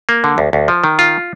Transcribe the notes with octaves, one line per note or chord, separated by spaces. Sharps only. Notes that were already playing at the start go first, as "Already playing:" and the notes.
A#3
D3
D2
D2
F3
D#3
F4